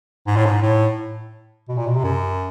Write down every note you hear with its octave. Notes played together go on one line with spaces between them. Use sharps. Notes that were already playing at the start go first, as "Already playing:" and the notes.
G#2
A2
G#2
A2
B2
A#2
B2
C3
F#2